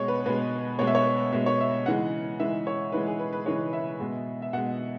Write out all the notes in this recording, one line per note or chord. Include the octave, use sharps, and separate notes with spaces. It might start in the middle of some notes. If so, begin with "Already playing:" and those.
Already playing: B2 G#3 C#5
B4
B2 G#3 B4
B2 G#3 C#5
E5
C#5
B2 G#3 E5
C#5
E5
C#3 E3 G#3 F#5
C#3 E3 G#3 E5
C#5
C#3 E3 G#3 B4
G#4
B4
B4
C#3 E3 G#3 C#5
E5
B2 G#3
E5
B2 G#3 F#5